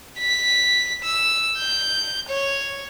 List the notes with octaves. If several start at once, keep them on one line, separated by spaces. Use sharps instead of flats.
B6
E6
G6
C#5